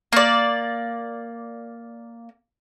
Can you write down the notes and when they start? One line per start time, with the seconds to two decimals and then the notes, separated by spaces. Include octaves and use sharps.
0.13 A#3 D5